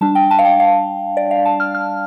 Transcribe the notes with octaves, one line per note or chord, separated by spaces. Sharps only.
G3 D4 A5
G5
A5
F5
G5
F5
D5
F5
A5
F6
F6